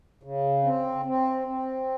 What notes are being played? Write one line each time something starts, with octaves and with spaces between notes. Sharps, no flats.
C#3
C4
C4
C4